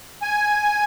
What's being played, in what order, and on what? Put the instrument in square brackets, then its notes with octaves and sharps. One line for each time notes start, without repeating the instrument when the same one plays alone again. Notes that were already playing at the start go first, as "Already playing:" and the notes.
[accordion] G#5